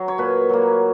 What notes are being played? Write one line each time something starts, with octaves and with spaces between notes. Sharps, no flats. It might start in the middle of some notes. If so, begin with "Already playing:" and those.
Already playing: F#3
C#5
A#2 B4
F#3 A#3